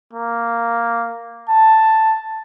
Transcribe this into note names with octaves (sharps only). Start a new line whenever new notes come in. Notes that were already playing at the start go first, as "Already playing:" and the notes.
A#3
A5